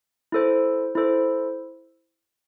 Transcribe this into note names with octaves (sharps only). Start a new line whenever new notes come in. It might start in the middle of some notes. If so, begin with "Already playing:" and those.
E4 A4 C5
E4 A4 C5